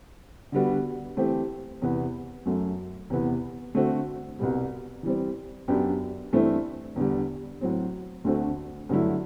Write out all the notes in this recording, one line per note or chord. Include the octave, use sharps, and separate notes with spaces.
D3 G3 B3 F#4
E3 A3 C4 G4
E2 C3 E3 B3
F#2 F#3 A3
E2 C3 E3 B3
D3 A3 C4 F#4
C2 B2 G3
E3 G3 C4
F#2 F#3 B3 D4 G4
G2 E3 A3 C4 E4
E2 D3 G3
A2 F#3 C4
D2 D3 A3 C4 F#4
G2 D3 F#3 A3 E4